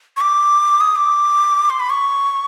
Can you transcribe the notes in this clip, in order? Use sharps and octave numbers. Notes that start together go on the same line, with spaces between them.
C#6
D6
D#6
D6
C6
B5
C#6